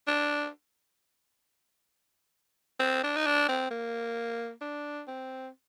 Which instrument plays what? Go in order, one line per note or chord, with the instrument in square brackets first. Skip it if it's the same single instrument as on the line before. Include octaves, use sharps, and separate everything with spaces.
[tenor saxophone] D4
C4
D4
D#4
D4
C4
A#3
D4
C4